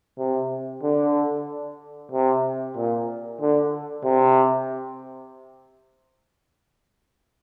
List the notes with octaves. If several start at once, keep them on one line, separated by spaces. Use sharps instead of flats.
C3
D3
C3
A#2
D3
C3